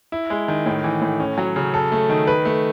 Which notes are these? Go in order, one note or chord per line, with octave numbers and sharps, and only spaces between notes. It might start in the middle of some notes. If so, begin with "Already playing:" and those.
E4
G#3
D#3
A2
E3
A2
C#4
F#3
C#3
A4
A3
D#3
B4
A3